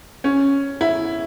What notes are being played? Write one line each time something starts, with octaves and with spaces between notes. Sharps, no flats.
C#4
E4